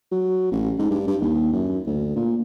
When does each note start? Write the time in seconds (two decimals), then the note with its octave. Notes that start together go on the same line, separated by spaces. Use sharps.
0.11 F#3
0.52 A1
0.79 G#2
0.91 G2
1.07 G2
1.21 D#2
1.53 F#2
1.87 D2
2.16 A#2